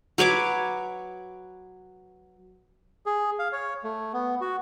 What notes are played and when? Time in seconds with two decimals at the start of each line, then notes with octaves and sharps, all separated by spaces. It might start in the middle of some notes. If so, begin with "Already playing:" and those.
0.18 F#3 B4 C#5 D6
3.06 G#4
3.39 F5
3.52 C#5
3.84 A3
4.14 B3
4.41 F#4